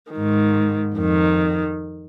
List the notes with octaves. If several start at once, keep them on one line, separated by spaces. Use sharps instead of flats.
G#2 D#3
F2 D#3